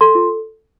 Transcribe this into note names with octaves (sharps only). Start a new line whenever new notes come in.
A4 C6
F4